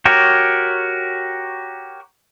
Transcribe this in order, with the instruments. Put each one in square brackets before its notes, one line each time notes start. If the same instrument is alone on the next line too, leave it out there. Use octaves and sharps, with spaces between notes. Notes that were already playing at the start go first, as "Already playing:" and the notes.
[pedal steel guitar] F#4 G4 A#4 C#5